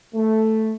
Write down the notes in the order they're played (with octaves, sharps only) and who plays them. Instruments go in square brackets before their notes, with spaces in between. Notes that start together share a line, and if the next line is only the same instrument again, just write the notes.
[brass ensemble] A3